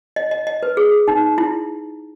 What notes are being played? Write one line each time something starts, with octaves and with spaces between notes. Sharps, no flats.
D#5
D#5
D#5
B4
G#4
D#4
E4